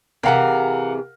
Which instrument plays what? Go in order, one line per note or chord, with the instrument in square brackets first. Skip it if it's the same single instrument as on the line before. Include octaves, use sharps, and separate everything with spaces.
[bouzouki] C3 E3 G#4 [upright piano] A#4 F5 F#5